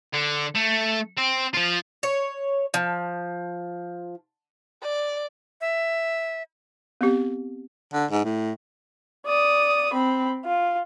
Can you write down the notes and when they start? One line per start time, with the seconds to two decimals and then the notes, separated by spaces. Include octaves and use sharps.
0.13 D3
0.55 A3
1.17 C4
1.54 F3 F4
2.03 C#5
2.74 F3
4.83 D5
5.61 E5
7.01 B3 C4 G4
7.93 D3
8.11 G#2
8.24 A2
9.26 D5 D#6
9.93 C4 B5
10.45 F4